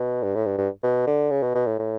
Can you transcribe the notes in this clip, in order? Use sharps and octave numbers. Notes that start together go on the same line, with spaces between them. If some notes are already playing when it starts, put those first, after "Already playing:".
Already playing: B2
G2
A2
G2
G2
B2
D3
C#3
B2
B2
A2
A2